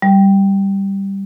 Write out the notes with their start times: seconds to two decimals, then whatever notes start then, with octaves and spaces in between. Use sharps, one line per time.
0.02 G3